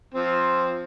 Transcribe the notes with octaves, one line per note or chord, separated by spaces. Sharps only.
F3 C4